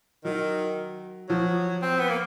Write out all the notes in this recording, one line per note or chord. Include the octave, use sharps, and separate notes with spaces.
D#3 F#3
F3 F#3
C4
B3
A#3